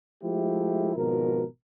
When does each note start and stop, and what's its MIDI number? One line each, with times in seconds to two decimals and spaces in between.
0.24 0.93 53
0.24 0.93 56
0.24 0.93 57
0.24 0.93 64
0.24 0.93 67
0.95 1.44 32
0.95 1.44 47
0.95 1.44 53
0.95 1.44 70